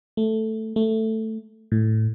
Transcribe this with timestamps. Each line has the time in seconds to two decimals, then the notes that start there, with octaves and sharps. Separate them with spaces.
0.17 A3
0.76 A3
1.72 A2